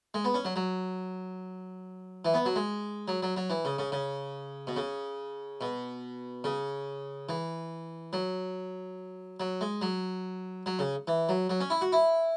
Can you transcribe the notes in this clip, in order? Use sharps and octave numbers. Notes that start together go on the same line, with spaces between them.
G#3
B3
C#4
F#3
F#3
E3
B3
F#3
G#3
F#3
F#3
F#3
E3
C#3
C#3
C#3
B2
C#3
B2
C#3
E3
F#3
F#3
G#3
F#3
F#3
C#3
E3
F#3
F#3
C#4
E4
F#4
E4